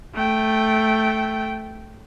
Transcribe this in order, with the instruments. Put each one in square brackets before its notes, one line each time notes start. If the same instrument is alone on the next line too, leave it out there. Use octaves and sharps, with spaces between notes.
[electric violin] A3 G5